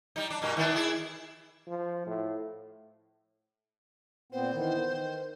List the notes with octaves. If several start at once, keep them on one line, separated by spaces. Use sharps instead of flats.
G3 D#4
D4
G2 B2 A#3
D#3 B3 D4
E4 G#4
F3
A2
A#2 B3 C4 C5
D#3 E3 B3
D#3